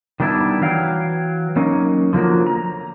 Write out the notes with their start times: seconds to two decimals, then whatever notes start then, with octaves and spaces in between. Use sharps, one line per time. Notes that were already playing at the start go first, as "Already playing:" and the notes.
0.20 D#3 G3 B3 D4 E4
0.61 E3 F#3 F5 G5
1.56 F#3 A#3 C#4 D#4
2.13 D3 F3 F#3 A#3
2.47 A#5